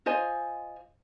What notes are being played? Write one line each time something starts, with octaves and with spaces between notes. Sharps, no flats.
F4 C5 D#5 G#5